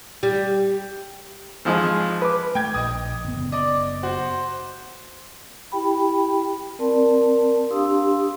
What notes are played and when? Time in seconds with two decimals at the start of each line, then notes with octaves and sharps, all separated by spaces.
0.23 G3
1.65 G#1 F3 G#3
2.22 B4 D6
2.55 A3 G5 G#6
2.74 A#1 D#5 D#6
3.24 F#1 B3
3.52 D5 D#5
4.03 F#4 C5
5.72 E4 G4 G5 B5
6.79 C4 A#4 D5 A5 C6
7.70 D4 G4 F5 C6 D#6 E6